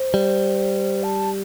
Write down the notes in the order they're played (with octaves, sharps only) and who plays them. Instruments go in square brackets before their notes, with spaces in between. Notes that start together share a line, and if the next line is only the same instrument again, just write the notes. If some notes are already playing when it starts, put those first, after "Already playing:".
Already playing: [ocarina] C5
[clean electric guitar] G3
[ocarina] A5